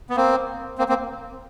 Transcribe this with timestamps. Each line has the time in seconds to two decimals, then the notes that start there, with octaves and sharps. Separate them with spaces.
0.10 B3
0.16 A#3 C4
0.78 A#3 C4
0.89 A#3 C4